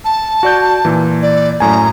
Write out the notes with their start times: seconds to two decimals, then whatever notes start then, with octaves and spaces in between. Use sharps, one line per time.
0.05 A5
0.43 F#4 D5 G6
0.85 A#2 E3
1.22 D5
1.60 F#2 A2 G#5 A#5